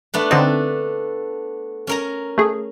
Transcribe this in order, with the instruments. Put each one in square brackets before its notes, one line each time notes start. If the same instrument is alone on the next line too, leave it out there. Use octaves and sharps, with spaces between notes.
[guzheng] A3 B3 D4
[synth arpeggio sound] D3 C4 D#4 [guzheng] A4
[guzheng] C#4 A#4 A#5
[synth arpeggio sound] A3 G#4